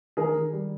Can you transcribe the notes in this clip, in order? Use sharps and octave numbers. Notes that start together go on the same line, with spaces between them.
D#3 G#4 A#4
D#3
G3